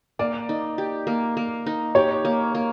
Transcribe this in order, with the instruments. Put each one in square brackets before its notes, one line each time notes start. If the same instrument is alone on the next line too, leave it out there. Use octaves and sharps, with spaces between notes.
[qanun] A#3 [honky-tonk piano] D5
[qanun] D#4
G4
A#3
A#3
D#4
[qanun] G4 [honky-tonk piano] C#5
[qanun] A#3
A#3